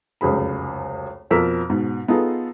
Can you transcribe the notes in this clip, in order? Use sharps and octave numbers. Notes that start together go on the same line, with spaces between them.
F1 C#2 F#2 G#4 B5
F2 B2 F3 A#4 E6 B6
G#2 B2
B3 D#4 F4 G#4 A4